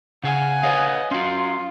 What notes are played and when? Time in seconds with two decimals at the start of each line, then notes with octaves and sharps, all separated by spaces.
0.24 C#3 G#4 F#5 G#5
0.63 B4 C#5 D#5 F5
1.11 C#4 F4 F#4 C6